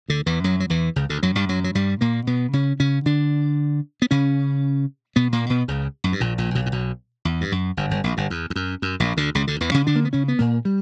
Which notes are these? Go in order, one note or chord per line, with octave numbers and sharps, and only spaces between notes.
D2 D3
E2 E3
F#2 F#3
F#3
E2 E3
C#2 C#3
D2 D3
F#2 F#3
G2 G3
F#2 F#3
F#3
G2 G3
A#2 A#3
B2 B3
C#3 C#4
C#3 C#4
D3 D4
B3
C#3 C#4
B2 B3
A#2 A#3
B2 B3
C#2 C#3
F#2
G2
A#1 A#2
A#1 A#2
B1 B2
A#2
B1 B2
E2
G2
F#2
G1 G2
G1 G2
A#1 A#2
G1 G2
E2
E2
F#2
F#2
A#1 A#2
D2 D3
C#2 C#3
D2 D3
E2 E3
C#3 C#4
D3 D4
A#3
B3
C#3 C#4
B3
A#2 A#3
G3